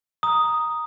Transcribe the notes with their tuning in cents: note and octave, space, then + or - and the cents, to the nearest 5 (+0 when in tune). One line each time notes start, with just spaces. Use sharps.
A#5 +5 D#6 +0